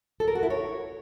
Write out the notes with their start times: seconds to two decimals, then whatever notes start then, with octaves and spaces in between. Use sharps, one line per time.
0.20 A4
0.28 A#4
0.35 F#4
0.43 E4
0.50 C#5